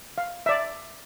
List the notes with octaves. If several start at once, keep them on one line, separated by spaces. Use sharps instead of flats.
F5
D5 E5